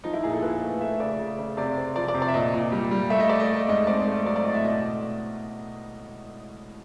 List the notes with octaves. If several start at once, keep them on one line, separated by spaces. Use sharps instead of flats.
F3 D#4
E4
A#2 G#4
A4
A#2 B4
A3
A3 E5
C#3 D5
C#3
C#3
C3 D5
C4
F3 D5
D5
C3
D5
E5
A#2 D#5
A#2
G3
G3
A3 E5
D#5
A3 D5
D#5
A3
G#2 D#5
C4 D5
A3
F#3 D5
D5
A2 D#5
E5
B2 D#5